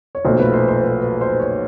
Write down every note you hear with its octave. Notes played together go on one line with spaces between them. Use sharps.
C#5
B1 A#2 F3 A3 C5
B4
C5
C5
B4
B4
C5
C#5